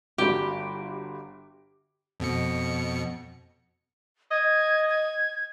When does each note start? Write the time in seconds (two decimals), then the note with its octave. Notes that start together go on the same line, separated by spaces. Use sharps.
0.18 G1 G3 F#4 G4
2.20 F2 B2 C#7
4.31 D#5 G#6
4.89 G#6